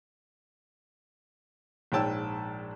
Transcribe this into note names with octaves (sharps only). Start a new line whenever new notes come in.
A#1 G#2 C#5 G5 A5 E6